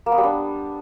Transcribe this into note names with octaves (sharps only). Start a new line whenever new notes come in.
A#3
B3
G3
D4